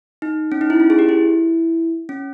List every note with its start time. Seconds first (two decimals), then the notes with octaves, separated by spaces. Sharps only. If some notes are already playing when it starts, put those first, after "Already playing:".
0.22 D#4
0.52 C#4
0.61 D#4
0.70 E4
0.80 C#4
0.90 G#4
0.99 G4
1.09 E4
2.09 C#4